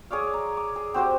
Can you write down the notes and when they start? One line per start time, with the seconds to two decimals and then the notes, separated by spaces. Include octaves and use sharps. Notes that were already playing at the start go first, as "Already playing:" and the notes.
0.11 G#4 C#5 D5 F5
0.34 A#5
0.57 D6
0.76 G#4
0.94 C4 F#4 G4 C5